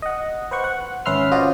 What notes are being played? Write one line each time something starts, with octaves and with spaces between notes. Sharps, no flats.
D#5 F#5
B4 C5 F#5 C#6
F#5
G#1 C#4 B4 E5 C6 F6
C#4 F4 F#4 C5 D5 D#5